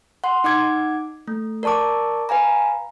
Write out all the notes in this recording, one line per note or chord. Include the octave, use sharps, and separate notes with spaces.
F#5 C6
D#4 F#5 D6 G#6
A3
A#4 D5 A5 C#6 D6
B4 F5 G#5 A#5